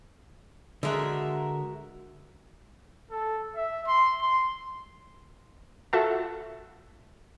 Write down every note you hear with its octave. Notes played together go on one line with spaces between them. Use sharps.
D3 G#3 F#4 A#4 E5
A4
E5
C6
C6
F4 F#4 A4 E5 F#5 A5